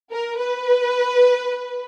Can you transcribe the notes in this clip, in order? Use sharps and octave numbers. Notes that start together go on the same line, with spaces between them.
A#4
B4